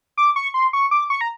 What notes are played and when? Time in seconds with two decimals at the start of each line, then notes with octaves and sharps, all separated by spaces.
0.18 D6
0.36 C#6
0.54 C6
0.73 C#6
0.91 D6
1.10 C#6
1.21 A#5